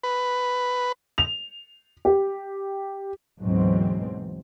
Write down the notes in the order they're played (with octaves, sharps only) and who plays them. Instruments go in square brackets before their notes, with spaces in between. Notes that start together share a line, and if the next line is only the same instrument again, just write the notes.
[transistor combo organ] B4
[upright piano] F7
G4
[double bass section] D2 G#2 B2 E3 F#3 C4